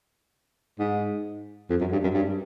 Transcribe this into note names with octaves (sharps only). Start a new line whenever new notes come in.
G#2
F2
F#2
G2
F#2
G2